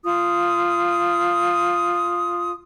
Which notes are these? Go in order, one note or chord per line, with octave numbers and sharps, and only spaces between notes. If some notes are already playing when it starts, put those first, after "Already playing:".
F4 D#6